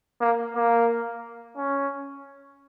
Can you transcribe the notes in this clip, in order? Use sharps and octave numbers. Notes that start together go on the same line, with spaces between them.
A#3
A#3
C#4